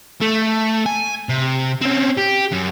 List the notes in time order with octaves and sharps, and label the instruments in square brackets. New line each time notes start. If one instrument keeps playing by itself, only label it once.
[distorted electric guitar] A3
G#5
C3
C4 C#4
G4
F#2